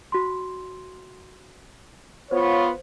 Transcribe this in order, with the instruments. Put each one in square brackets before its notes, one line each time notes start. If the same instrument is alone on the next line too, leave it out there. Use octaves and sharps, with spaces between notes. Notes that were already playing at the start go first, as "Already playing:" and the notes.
[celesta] F#4 C6
[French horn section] B3 F4 [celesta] C5 [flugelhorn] C#5